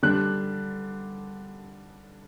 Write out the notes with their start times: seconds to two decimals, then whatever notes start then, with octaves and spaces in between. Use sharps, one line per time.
0.03 D3 G3 D4 F#6